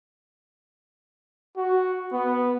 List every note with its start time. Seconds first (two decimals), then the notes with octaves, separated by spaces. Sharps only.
1.57 F#4
2.12 B3